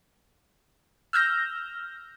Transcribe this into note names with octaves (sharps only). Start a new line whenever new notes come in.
E6 F6 G6 A#6